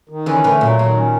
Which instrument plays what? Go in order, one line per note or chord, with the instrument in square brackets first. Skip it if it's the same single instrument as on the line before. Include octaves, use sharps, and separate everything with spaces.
[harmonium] D#3
[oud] D3 E3 [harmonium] C#4
[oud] D3 E3 [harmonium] A3
[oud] A#2 [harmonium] F#3
[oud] A#2 [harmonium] D#3
[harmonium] C#4